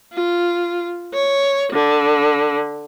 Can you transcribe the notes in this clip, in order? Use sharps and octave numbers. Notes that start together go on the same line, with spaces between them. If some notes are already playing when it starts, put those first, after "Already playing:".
F4
C#5
D3